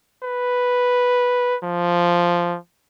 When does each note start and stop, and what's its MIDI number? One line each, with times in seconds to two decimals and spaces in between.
0.24 1.57 71
1.64 2.58 53